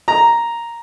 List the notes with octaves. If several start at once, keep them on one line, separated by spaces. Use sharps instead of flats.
A#5